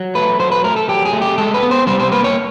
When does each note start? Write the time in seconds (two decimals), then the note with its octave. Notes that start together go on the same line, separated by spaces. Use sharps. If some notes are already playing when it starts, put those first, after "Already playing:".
Already playing: F#3
0.15 A3 B4
0.40 F#3 C5
0.52 B4
0.64 A3 A#4
0.76 A4
0.88 F#3 G4
1.05 G#4
1.13 A3
1.21 G4
1.38 G#3 A4
1.54 B4
1.63 B3
1.71 C5
1.87 G3 C5
2.00 C5
2.12 A#3 B4
2.24 C#5